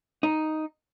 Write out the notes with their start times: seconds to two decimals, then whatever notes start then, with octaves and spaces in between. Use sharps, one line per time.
0.23 D#4